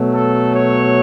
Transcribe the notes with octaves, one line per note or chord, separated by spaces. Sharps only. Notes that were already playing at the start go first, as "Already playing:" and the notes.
Already playing: B2 F#3 A3
A4
C#5